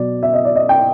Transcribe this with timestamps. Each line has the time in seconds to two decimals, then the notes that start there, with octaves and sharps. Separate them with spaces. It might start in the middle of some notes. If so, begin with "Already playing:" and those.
Already playing: B2 F#3 D5
0.23 E5
0.34 D#5
0.45 D5
0.56 D#5
0.69 G5